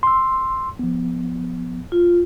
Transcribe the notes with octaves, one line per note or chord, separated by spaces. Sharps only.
C6 E6
F3 B3
F4